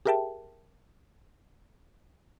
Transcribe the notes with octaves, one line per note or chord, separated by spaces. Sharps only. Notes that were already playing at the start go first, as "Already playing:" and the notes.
G4 G#4 A#4 E5 G5 A5